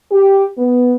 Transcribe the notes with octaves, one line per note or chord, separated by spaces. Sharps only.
G4
B3